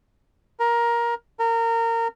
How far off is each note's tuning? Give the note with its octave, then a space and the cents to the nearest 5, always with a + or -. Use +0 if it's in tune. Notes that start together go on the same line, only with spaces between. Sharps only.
A#4 +15
A#4 -25